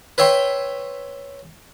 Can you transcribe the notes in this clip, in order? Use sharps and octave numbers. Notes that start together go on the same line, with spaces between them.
B4 C#5 E5 G5 C6